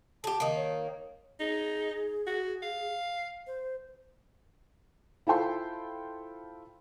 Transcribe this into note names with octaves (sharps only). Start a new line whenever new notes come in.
G4 G#4 A5
D#3 A#3
C#5
D#4 G#4
F#4
F5
C5
E4 F4 A4 C5 G5 C6